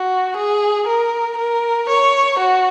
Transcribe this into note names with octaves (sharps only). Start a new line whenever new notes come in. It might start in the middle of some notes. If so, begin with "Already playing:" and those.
Already playing: F#4
G#4
A#4
A#4
C#5
F#4